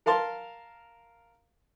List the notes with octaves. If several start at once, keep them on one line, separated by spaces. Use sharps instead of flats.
A#4 F5 A5 C6